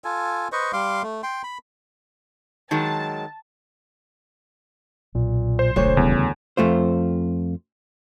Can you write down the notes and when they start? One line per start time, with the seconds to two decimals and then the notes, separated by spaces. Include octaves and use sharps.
0.04 F4 A4 G#5
0.52 B4 C5 D#5 C#6
0.73 G3 F5 C6 D6
1.03 A3
1.23 G5 C6
1.43 B5
2.71 D#3 F#3 G#3 A5
5.15 B1 A#2
5.59 C5
5.76 E1 D2 C#5
5.97 E2 C#3 G3
6.57 F2 A3 F4 C5